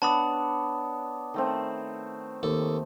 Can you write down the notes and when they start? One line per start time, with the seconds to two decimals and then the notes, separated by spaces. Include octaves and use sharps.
0.02 B3 D4 C#5 A5 B5 D#6
1.34 D#3 A3 C4
2.43 D#2 A4